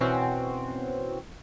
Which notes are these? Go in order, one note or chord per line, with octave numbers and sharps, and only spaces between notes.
B2 E3 C4 C#4 F#4